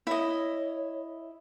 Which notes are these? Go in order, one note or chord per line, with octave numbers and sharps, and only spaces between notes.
E4 C#5 D#5